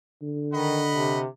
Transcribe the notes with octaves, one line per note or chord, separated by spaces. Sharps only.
D3
D#3 D#5 F#5 B5
C3